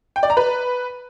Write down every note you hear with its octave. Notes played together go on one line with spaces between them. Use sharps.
G5
D5
A#5
B4